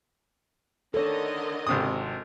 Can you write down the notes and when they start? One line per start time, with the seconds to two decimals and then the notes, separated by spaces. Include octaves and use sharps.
0.94 D3 D#3 A4 C#5 D#5
1.67 G#1 C3 D#6